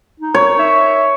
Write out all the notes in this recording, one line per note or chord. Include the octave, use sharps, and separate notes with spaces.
D#4
C#5
E5